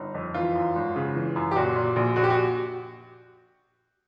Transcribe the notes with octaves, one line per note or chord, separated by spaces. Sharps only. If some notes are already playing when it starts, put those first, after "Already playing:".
Already playing: G1 D#4
F2
E3 F4
F#2
G#1
C#3
E3
F#2
G4
A#2 F#4
A#2
A#1
A#1 F#4
G4
F#4